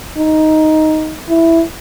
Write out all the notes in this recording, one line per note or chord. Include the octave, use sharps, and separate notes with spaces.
D#4
E4